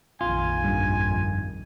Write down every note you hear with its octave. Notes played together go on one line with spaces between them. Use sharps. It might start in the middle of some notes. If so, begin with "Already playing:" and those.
A#1 F2 D#3 F4 G#5
G2